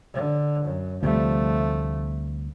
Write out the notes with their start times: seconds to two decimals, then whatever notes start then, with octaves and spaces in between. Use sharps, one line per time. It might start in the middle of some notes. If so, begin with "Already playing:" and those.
0.14 D3
0.64 F#2
1.03 D2 C3 F3 G3 A3